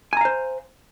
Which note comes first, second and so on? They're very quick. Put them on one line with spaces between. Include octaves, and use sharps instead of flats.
G#5 A#5 F5 C5